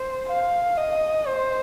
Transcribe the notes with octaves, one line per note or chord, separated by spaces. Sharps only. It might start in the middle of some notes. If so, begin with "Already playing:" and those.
Already playing: C5
F5
D#5
C5